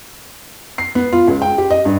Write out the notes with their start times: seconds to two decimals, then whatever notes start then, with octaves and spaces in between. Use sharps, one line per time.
0.78 C7
0.95 B3
1.13 F4
1.27 C#2
1.42 G5
1.58 G4
1.70 D#5
1.85 G2